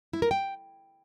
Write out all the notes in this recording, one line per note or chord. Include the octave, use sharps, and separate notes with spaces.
E4
A#4
G5